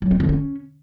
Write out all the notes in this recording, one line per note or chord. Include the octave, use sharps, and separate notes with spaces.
F#3
C4
D3
C#4